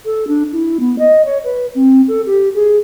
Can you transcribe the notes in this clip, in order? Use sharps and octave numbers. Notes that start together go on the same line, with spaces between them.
A4
D4
E4
B3
D#5
C#5
B4
C4
A4
G4
G#4